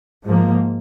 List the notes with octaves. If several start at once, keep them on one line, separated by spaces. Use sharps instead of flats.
G#2 F3 A#3